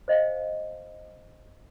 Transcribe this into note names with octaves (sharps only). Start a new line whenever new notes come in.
C5 D#5 F5 G5